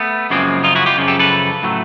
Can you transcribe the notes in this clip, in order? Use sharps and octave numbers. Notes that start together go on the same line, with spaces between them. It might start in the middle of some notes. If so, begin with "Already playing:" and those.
Already playing: A3 B3
F#2 C#3 F3 G#3 A#3 C4
D#4 F4
E4 F#4
F4 G4
F#2 C#3 F3
G4 A4
A4 B4
A2 F#3 A3